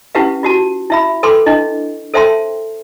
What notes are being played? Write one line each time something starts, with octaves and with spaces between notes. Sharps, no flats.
C#4 E4 G4 B4 F5
F4 F#4 A5
E4 E5 B5
A4 B4 G5 C6 D6
D4 E4 D#5
A4 C5 E5 G5 A5 C6